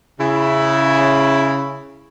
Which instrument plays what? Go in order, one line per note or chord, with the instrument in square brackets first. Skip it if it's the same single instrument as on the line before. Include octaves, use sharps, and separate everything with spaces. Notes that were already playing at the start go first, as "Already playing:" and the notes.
[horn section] C#3 E4